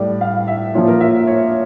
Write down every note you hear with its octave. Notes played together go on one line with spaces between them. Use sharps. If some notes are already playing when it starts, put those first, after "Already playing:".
Already playing: A2 G3 D5
F5
E5
A#2 F3 C#5
A#4
E5
E5
C#5